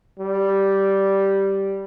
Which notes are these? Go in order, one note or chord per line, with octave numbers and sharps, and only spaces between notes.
G3